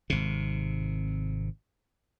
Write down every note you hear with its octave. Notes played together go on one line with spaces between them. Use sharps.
G#1 C3